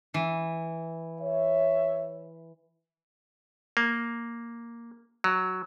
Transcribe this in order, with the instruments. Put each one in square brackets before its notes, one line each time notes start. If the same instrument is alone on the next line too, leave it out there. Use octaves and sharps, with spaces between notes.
[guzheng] E3
[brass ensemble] C#5 E5
[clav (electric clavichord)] A#3
F#3